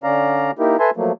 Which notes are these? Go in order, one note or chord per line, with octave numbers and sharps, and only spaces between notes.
D3 C#4 D5 F5 A#5
A#3 D#4 E4 G4 A#4
A4 B4 E5 G#5 A5 C6
F3 F#3 A3 A#3